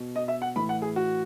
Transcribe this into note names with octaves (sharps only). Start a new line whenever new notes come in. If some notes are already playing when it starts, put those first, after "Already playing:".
Already playing: B2
D#5
E5
F#5
A2 E3 B5
F#5
G#4
F#4